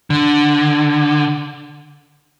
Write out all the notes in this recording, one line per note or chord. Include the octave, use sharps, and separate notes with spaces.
D3